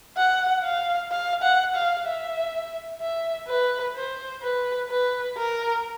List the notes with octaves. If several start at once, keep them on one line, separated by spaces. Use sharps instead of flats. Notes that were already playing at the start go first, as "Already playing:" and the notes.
F#5
F5
F5
F#5
F5
E5
E5
B4
C5
B4
B4
A#4